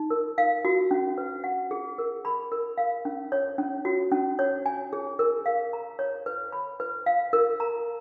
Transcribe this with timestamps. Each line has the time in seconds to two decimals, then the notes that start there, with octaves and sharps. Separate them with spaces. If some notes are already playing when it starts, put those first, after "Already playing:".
Already playing: D#4
0.10 A#4
0.38 F5
0.65 F#4
0.91 C#4
1.18 B4
1.44 F#5
1.71 G#4
1.98 A#4
2.25 B5
2.52 A#4
2.78 F5
3.05 C#4
3.32 C#5
3.58 C#4
3.85 F#4
4.11 C#4
4.39 C#5
4.66 G#5
4.93 G#4
5.19 A#4
5.46 F5
5.73 A#5
5.99 C#5
6.26 B4
6.52 B5
6.80 B4
7.06 F5
7.33 A#4
7.60 A#5